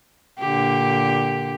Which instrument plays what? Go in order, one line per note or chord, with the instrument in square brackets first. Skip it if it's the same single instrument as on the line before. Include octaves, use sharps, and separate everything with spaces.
[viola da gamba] A#2 D3 G4